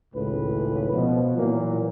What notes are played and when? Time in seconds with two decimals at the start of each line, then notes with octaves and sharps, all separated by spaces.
0.15 G#1 C#2 A2 B4
0.92 B2 F3
1.37 A#2 E3 F#3 A#3